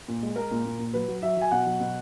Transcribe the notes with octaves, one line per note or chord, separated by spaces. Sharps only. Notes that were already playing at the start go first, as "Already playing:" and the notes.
A#2
G#3
G#3 A#4
A#2
A#2
A#2
F#3 B4
F#3
F#3 E5
F#3 G#5
B2 F#5
F#3
B2